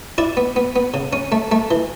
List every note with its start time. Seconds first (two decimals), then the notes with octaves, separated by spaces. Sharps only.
0.18 E4 D5
0.37 B3
0.56 B3
0.76 B3
0.94 C#3
1.13 C#4
1.32 A3
1.51 A3
1.71 E3